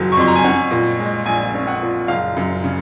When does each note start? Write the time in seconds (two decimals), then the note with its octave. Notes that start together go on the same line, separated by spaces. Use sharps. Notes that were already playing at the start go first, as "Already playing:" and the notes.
Already playing: F#1 F2 D#3 F#3
0.12 C#6
0.17 F2 C6
0.28 A#5
0.35 G#5
0.44 C#4 F#5
0.71 A#2
0.99 G#3
1.26 A#1 G#5
1.54 C#4
1.67 F#5
1.82 A#2
2.08 F#1 F5
2.37 F#2
2.64 C#3